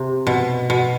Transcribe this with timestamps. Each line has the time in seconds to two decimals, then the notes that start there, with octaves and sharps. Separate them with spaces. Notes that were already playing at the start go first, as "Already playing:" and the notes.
Already playing: C3
0.27 B2
0.70 B2